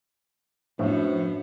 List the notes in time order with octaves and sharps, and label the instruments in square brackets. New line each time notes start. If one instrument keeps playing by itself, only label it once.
[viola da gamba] F#2 B3 [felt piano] A2 [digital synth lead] F3 [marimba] D4